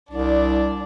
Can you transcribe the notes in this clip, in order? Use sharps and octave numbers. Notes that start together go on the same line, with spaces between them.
C2 D4 D5